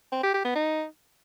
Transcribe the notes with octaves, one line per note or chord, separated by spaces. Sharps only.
C4
G4
G4
B3
D#4